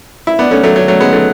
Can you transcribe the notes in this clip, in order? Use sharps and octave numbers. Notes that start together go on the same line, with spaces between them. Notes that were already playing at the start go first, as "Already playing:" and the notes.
E4
B3 D4
A3 C#4
F#3 A3
F#3
F#3 A3
G#3 B3
F#3 A3